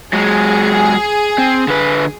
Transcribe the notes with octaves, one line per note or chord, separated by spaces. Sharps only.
F#3 G#3 G#4
C4
D3 B4